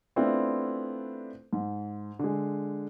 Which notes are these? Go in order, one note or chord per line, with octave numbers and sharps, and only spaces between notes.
A3 B3 C4 D4 E4 F4
G#2
D3 G#3